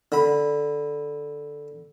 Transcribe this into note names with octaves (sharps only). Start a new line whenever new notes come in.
D3 B5